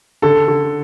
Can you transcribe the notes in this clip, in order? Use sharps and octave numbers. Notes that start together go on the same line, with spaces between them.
D3 A4
D3